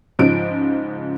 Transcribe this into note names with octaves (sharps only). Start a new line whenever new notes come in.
G#2 C#3 F3 D7